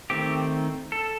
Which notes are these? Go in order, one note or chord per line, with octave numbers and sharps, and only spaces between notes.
D#3 A3 C4 G4
A4